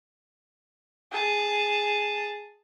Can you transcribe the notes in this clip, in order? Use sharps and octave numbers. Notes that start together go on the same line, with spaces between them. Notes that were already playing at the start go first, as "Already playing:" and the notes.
G#4 A5